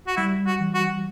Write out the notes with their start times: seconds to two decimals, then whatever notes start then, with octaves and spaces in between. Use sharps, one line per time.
0.08 F#4
0.17 G3 E4
0.46 F#4
0.60 E3
0.74 F#4